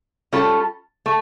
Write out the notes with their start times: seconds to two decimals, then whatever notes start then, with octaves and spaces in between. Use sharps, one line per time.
0.32 G3 C#4 F4 A4
1.06 A3